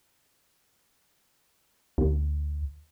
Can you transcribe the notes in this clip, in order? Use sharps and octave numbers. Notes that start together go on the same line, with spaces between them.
D2